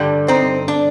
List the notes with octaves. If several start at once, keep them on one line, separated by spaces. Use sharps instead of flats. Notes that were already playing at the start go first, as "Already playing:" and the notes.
Already playing: G2 D3 G3
C4 D#4
D4